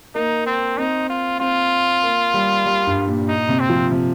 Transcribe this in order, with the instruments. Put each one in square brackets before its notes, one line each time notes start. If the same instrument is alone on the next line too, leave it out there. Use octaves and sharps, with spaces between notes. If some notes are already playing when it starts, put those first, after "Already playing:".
[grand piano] A#3 [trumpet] D#4
[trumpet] C4
[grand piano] C4 [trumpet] D#4
[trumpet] F4
[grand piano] C4 [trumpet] F4
[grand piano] A#3
G3
G3
G2
A#2
[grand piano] A#2 [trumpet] D#4
[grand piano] C3
[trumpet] C4
[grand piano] F3
C3